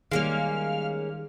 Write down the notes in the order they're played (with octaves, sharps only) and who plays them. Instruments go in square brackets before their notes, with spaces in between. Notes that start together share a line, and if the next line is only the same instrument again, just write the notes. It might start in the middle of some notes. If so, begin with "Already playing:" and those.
[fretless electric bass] D#3 G3 [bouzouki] G#3 A#3 C#4 [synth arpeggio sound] F5 F6